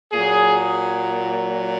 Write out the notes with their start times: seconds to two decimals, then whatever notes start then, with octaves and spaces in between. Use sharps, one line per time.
0.12 A#2 F#3 G#4